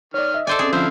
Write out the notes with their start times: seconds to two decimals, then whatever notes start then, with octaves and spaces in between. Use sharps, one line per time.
0.14 D#3 C#5 D5 F6
0.34 D#5 E5
0.47 A4 C5 D5 G#5
0.59 C4 C#4 G#4 A4
0.73 D3 F3 E4 C5 E5 F5